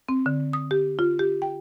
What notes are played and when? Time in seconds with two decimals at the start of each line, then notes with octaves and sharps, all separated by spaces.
0.09 C4
0.26 D3
0.53 D#6
0.71 G4
0.99 F4
1.19 G4
1.42 G5